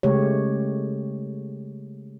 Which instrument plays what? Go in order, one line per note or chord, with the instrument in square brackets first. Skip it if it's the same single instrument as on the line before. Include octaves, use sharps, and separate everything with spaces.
[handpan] C#3 G#3 A3 G4 C#5